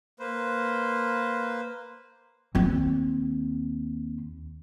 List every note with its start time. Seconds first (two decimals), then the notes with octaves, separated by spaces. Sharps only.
0.19 A#3 B4 C5
2.55 D#2 C4